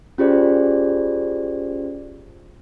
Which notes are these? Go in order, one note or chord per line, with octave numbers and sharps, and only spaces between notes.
C#4 F4 G4 G#4 C5 D5